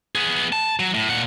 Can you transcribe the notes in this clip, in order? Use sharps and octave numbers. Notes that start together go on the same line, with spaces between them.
B3 G#4
A5
F#3
A2
A#2 F#5